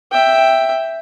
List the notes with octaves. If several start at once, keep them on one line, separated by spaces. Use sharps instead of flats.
E5 G5